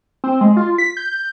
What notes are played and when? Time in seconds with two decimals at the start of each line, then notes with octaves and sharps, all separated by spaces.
0.24 C4
0.41 G#3
0.57 F4
0.78 B6
0.97 G6